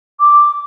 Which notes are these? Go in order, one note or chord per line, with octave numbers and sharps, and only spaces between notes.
D6